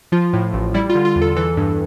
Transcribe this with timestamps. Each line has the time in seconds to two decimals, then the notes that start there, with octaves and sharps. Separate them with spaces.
0.12 F3 F4
0.33 A2
0.54 A1
0.74 G3 E4
0.90 F4
0.95 D3
1.05 F4
1.16 E2
1.22 A4
1.36 E3 A4
1.57 G2